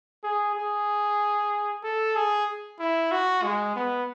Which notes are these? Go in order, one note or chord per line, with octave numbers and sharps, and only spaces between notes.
G#4
G#4
A4
G#4
E4
F#4
G#3
B3